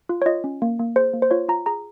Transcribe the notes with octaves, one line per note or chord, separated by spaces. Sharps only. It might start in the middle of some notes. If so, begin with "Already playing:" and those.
F4
C#5
F4 D#5
C#4
A#3
A#3
G#4 C5
A#3
C5
F4 C#5
F4 A#5
G#4 A#5